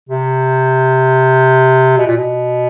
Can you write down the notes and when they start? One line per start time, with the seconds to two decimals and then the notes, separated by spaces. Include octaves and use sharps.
0.09 C3
1.97 B2
2.07 A#2
2.17 B2